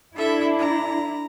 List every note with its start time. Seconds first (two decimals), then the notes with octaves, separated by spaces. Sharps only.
0.16 D4 E4 A4 E5
0.59 A#5